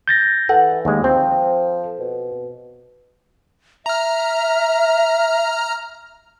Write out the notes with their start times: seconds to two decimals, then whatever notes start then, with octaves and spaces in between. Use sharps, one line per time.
0.08 G6 A6 A#6
0.49 E3 A4 F#5
0.85 D#2 G#3
1.04 F3 C4
1.99 B2
3.86 E5 A#5 F6